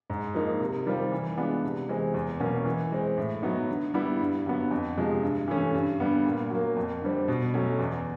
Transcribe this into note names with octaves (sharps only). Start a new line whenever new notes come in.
G#2
F3 A#3 D#4
C3
D#3 G3 C4 F4
E3
G#3 B3 D4 F4
C3
E3 G#3 C4
E2
B2 F#3 A#3 C#4
E3
G#3 C4
A2
F#3 B3 D#4
D3
G3 B3 E4
G2
D3 F#3 B3
F2
C3 F3 G#3
G2
E3 A3 C#4
G2
D3 G3 B3
A#2
F#3 A#3
F2
D3 G3 C4
B2
F#3 A3 C#4
E2